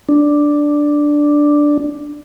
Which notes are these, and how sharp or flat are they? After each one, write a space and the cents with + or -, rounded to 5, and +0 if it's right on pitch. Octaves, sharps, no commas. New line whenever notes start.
D4 +0